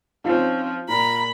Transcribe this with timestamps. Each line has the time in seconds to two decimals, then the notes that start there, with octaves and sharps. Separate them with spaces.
0.25 F3 C4 C#4 D#4 F4
0.88 A#2 A#5 B5